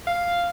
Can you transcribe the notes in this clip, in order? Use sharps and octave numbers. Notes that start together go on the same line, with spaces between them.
F5